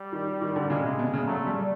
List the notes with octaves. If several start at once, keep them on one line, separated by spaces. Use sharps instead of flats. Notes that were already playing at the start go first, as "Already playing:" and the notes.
Already playing: G3
D#3
D#3
D3
C#3 G#3
C3
B2
C#3
F#3 A3
G3